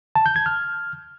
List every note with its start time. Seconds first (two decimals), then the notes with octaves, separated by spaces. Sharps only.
0.15 A5
0.26 G6
0.36 G#6
0.46 F6